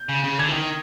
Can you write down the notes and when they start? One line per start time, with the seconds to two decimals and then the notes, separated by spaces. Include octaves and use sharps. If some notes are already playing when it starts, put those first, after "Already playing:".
Already playing: G6
0.09 C#3
0.24 C#3
0.38 D3 G#6
0.49 E3
0.53 D#3